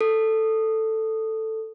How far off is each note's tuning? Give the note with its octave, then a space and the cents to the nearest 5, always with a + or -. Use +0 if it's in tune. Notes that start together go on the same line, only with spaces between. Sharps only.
A4 +5